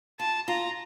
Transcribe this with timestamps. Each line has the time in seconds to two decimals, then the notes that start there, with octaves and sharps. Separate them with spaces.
0.19 F4 A5
0.48 F4 A#5